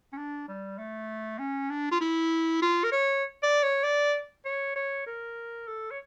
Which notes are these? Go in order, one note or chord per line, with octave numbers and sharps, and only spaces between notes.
C#4
D4
G3
A3
C#4
D4
F4
E4
F4
A#4
C#5
D5
C#5
D5
C#5
C#5
A#4
A4
C#5